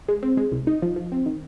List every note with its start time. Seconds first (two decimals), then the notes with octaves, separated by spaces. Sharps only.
0.08 G#3
0.23 C4
0.37 G#3
0.52 C2
0.67 D#4
0.82 F3
0.96 F3
1.12 C4
1.26 D#3